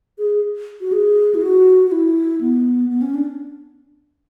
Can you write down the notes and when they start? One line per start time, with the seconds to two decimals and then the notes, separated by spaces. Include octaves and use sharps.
0.18 G#4
0.81 F#4
0.92 G#4
1.35 E4
1.42 F#4
1.87 F#4
1.92 E4
2.41 B3
2.90 B3
3.02 C#4
3.14 D4